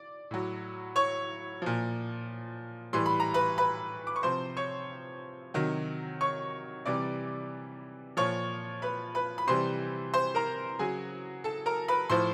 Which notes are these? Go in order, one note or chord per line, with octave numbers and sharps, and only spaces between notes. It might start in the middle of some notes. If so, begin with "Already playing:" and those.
Already playing: D5
A2 F#3
C#5 C#6
A#2 F3
A2 E3 G3 C6
B5
A#5
B4 B5
B4 B5
D6
C#6
C3 F3 C5 C6
C#5 C#6
C3 D#3 F#3
C#5 C#6
C3 E3 G3 D5 D6
A#2 F3 C#5 C#6
B4 B5
B4 B5
B5
C3 E3 G3 C5 C6
C5 C6
A#4 A#5
C#3 F#3 G#4 G#5
A4 A5
A#4 A#5
B4 B5
A2 F3 C5 C6